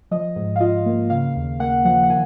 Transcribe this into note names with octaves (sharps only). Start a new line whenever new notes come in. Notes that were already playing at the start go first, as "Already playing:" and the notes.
F3 D#5
G#2
F5
F4 D#5
A#3
C#3 F5
D#2
A#3 F#5
F3 F#5
F#5
D#3 G#5